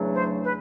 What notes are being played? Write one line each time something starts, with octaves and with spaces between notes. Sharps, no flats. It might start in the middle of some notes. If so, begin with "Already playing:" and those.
Already playing: E2 C#3 F#3 A3 D4
C5
B4